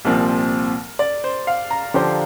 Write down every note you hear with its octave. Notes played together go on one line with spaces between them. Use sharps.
C2 A#2 F3 C4 A#4
D5
C5
F5
A#5
D3 F3 D4 G4 C5